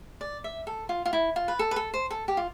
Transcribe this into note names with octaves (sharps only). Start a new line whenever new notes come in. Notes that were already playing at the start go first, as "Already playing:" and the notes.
D5
E5
A4
F4
F4
E4
F4
B4
A4
B4
A4
C5
A4
G4
F4